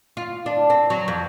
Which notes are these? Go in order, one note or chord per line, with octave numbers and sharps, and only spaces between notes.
F4
D4
C4
F#3
F2